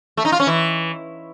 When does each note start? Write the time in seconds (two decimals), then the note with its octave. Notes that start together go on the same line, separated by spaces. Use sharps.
0.17 A3
0.25 D#4
0.32 F4
0.40 C#4
0.47 E3